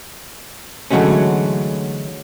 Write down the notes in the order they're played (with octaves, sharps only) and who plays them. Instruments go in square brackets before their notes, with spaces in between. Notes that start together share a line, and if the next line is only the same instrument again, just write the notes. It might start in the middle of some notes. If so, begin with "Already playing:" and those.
[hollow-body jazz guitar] D3 E3 F#3 G#3 A3 C#4